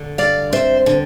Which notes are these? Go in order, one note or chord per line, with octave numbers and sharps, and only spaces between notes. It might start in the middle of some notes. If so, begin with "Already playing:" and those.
Already playing: D3
G2 D5 F5
C4 C5 E5
D3